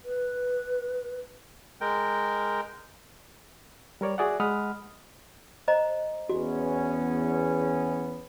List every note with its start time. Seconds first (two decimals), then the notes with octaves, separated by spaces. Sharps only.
0.05 B4
1.81 G#3 A#4 G5
4.01 G3 A#4 C#5 D5
4.18 F#4 G#4 D5 E5 F#5
4.40 G#3 D#5 F#5 B5 D#6 F6
5.68 C5 D#5 A#5
6.29 E2 B3 C#4 F#4